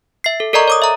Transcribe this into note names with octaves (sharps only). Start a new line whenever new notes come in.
E5 C7
A4
A4 A#4 D5 D#5 A#5 C#6
C#5 D6 D#6
E5 A#5